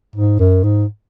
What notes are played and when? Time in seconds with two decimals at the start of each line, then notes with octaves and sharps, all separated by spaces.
0.16 G#2
0.40 F#2
0.64 G#2